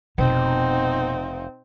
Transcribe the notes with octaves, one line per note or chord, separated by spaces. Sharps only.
F1 B2 C4 D#4